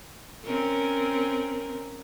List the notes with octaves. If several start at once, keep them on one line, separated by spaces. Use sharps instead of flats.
C4 C#4 A#4